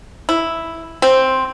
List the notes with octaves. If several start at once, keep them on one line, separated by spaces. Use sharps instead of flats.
E4
C4